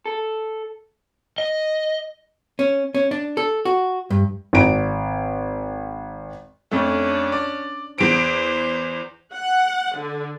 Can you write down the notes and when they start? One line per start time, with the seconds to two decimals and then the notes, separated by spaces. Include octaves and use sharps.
0.06 A4
1.38 D#5
2.59 C#4
2.95 C#4
3.11 D4
3.37 A4
3.65 F#4
4.10 G2
4.53 G#1 D7
6.71 F2 A3 C#4 D4
7.32 D5
7.98 E2 C5 D7
9.33 F#5
9.97 D3